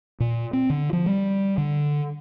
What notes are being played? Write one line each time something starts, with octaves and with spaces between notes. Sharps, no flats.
A#2
C4
D3
F3
G3
D3